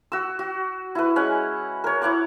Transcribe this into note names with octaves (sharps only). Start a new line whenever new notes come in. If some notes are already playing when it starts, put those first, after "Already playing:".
F#4 E6
F#4
E4 B4
G#3 C#4 F#5
A#4 C#5
E4 C#5 F#5 D6